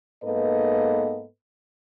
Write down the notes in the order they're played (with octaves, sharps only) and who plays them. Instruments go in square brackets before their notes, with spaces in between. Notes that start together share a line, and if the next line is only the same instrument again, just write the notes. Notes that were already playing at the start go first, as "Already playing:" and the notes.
[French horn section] G#2 A#3 B3 A4 B4 D#5